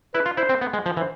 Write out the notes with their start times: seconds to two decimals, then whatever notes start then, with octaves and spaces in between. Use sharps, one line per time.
0.15 E4 B4
0.26 F4
0.37 E4 C5
0.49 C4
0.61 B3
0.73 G#3
0.86 F3
0.97 E3
1.00 C5